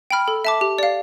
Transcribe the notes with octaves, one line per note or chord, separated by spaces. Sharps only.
G5 B5 F6
A4
E5 A5 D6
G4
D5 F5